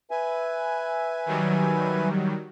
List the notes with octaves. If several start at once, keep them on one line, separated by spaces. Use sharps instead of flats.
B4 E5 G#5
D#3 F#3 G3